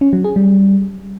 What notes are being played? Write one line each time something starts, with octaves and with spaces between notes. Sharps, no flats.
C#4
F#3
G#4
G3